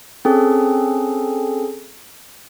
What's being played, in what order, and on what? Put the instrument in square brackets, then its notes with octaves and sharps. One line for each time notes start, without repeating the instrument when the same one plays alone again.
[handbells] C4 C#4 G#4 A4